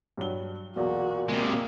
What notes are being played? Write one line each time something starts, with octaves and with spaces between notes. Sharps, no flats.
G2 F#3 G7
B1 E2 A#2 F#4
C3 G#3 A#3